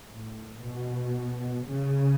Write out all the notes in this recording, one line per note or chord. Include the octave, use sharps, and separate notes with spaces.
A2
B2
C#3